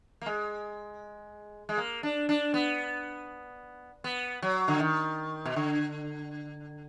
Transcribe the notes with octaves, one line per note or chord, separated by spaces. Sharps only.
A#3
G#3
G#3
A#3
D4
D4
B3
B3
F#3
D3
D#3
B2
D3